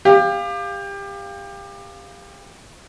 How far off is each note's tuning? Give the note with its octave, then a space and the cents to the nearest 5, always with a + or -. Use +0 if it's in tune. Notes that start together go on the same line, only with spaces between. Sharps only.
G4 +25 F5 +0